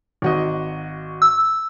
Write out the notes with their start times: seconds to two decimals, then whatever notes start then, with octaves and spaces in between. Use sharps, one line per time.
0.22 G#1 F#4 D#5
1.22 E6